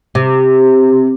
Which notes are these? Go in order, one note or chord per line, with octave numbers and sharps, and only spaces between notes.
C3